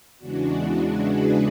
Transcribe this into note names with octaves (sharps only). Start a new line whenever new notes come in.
E2 C#3 E3 G#3 D4 F#4
G#4 B4